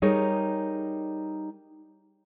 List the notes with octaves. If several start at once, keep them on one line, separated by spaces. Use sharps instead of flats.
G3 D#4 G#4 A#4 C#5